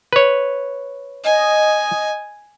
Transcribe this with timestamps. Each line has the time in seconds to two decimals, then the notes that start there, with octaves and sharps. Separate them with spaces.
0.13 B4 C#5
1.24 D#5 G#5